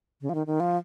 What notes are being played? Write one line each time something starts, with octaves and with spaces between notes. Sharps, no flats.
C#3
F3
D#3
D#3
F3